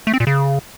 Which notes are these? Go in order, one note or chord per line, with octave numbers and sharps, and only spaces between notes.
A3
C4
A#2
C#3